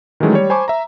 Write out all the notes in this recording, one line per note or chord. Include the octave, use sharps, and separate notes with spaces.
D#3 E3 F#3 G#3 A3 C#4
G3 C#5
C5 G#5 A5 B5 C#6 D6
E5 A#5